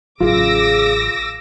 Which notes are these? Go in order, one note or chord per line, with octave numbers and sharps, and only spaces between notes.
A1 C#3 F#3 F4 G#4 D6 E6 A#6